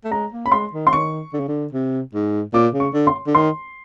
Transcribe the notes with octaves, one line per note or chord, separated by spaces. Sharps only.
A3
G#3 A#5
A#3
B5
G#3 C6
D#3
C6
D#3 C#6
D3
C#3
D3
C3
G#2
A#2 D6
C#3
C#6
D3
C6
D3
D#3 C6